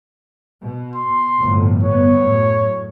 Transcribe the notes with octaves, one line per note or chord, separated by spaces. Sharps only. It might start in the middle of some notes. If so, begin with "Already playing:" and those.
B2
C6
G1 A2 F3
G1 B3 C#5
F#2 A2